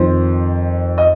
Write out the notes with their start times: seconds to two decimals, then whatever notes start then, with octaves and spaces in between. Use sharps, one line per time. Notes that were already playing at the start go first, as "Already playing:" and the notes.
Already playing: F2 D#3 C5
0.98 D#5